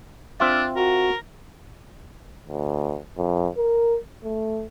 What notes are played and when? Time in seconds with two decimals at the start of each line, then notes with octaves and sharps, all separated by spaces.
0.40 C4 D4 F4 E5
0.76 F#4 A#4
2.48 D2
3.18 F2
3.58 A#4
4.24 A3